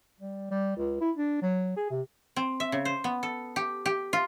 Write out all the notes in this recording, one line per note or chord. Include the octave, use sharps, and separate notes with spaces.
G3
G3
C#2
E4
D4
F#3
G#4
C3
C4
E5
C#3
C5
B3
A4
G4
G4
F4